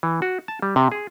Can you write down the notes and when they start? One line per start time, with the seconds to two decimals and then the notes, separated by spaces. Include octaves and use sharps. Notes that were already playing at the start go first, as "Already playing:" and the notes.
0.03 E3
0.22 F#4
0.48 A5
0.62 G3
0.76 C3
0.92 G#4